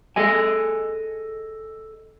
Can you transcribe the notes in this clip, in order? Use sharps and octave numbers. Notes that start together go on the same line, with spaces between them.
G#4 A4 D#5 G#5